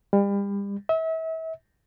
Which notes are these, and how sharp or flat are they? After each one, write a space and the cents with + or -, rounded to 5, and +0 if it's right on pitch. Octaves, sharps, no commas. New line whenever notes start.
G3 +35
E5 -35